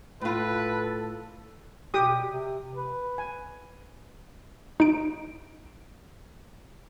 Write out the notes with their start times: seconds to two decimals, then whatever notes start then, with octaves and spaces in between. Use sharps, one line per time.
0.21 A2 F4 A4 B4
1.94 B2 G4 G5 D#6
2.28 C3
2.75 B4
3.18 G#5
4.80 D#4 D7